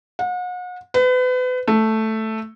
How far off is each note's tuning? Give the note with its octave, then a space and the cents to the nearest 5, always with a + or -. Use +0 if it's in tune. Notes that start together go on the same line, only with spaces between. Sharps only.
F#5 -40
B4 +35
A3 +0